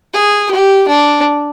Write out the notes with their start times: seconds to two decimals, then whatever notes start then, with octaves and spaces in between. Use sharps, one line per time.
0.13 G#4
0.51 G4
0.88 D4